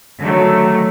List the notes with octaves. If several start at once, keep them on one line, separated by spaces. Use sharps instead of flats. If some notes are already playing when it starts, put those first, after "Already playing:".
D3 D#3 F#3 A3